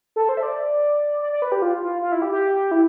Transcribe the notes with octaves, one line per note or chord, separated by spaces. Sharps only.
A4
C5
E5
D5
D5
D5
B4
G4
F4
F4
F4
E4
G4
G4
E4